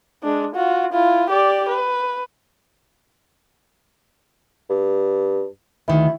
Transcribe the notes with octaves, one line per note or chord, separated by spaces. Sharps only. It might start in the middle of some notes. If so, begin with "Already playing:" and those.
G#3 D4
F4 F#4
E4 F4
G4 D5
B4
G2
D2 D#3 E4